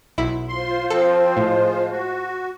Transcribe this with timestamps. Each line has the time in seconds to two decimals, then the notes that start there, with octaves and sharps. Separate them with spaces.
0.18 B1 E4
0.49 F4 C5 C6
0.90 F3 C4 A4
1.37 A2 F3 G#3
1.91 F#4